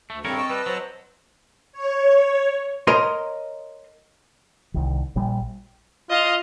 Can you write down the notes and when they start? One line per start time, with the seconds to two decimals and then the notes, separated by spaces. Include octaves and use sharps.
0.10 D2 A3
0.25 G2 D#3 G#3 C4 A4 A#4 C#5
0.37 D#5 A5 C#6 E6
0.50 G3 B4
0.66 F#3 C5
1.73 C#5
2.87 A#4 C#5 D#5 A#5 C6
4.74 C2 D#3
5.16 A#1 G3
6.10 F4 D#5 F5